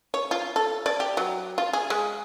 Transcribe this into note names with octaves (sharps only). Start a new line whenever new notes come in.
C#5
F4
A4
D5
G4
F#3
F4
G#4
G#3